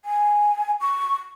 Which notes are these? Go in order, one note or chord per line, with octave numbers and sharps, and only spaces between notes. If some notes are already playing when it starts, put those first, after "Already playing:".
G#5
C#6